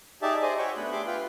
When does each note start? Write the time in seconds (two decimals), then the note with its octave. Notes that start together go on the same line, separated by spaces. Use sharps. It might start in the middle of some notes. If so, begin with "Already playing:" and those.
0.22 D#4 G4 G#4 D5 E5 A5
0.42 G#4 C5 D5 D#5 G#5
0.58 F#4 C#5 E5 G5 C#6
0.77 A3 B3 D4 B5
0.92 G4 G#4 E5 C6 D6
1.06 F4 B4 F5 G5